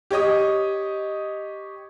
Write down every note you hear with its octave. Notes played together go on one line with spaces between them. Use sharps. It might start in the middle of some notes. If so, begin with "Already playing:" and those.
G4 C#5 D#5 D#6